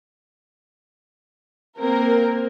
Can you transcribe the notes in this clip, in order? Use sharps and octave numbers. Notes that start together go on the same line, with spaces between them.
A#3 C4 A#4